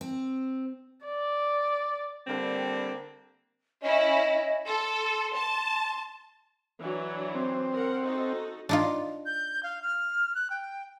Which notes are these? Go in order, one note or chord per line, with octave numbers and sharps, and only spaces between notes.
C4
D5
D3 G3 A#3 C4 D4
C#4 E4 D#5
A4 C6
A5
E3 F#3 D4
C4
A#4 F#5
D#4 F#4 A4
D4 D#4 F4
G6
F5
F6
F#6
G5